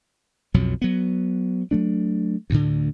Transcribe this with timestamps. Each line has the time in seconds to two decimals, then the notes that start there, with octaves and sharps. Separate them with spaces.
0.54 B1 F2 B2 F#3
0.82 F#3 B3
1.71 F#3 A3 D4
2.50 D2 A2 D3